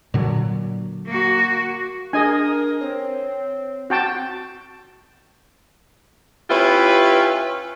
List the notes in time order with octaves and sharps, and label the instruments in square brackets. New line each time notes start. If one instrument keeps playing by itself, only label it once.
[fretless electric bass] A#2 D3 F#3
[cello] A#3 F#4
[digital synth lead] D4 [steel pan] G#4 D#5 G#5 [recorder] A#4
[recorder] C4 [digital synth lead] C#5
[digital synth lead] C4 [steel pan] F#4 G5 A5
[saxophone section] C#4 E4 F4 G4 B4